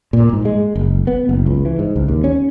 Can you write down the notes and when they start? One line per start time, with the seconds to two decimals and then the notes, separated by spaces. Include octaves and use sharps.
0.13 A#2
0.33 G#2
0.45 G#3
0.76 F#1
1.07 B3
1.29 F#1
1.46 C#2
1.65 E3
1.79 G#2
1.96 C#2
2.08 D#2
2.24 C#4